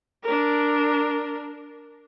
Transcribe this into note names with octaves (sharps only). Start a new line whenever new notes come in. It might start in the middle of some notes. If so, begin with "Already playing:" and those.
D4 A#4